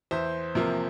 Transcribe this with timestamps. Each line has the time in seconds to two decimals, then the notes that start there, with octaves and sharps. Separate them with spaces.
0.11 E2 C5 E5
0.55 C3 F3 A#3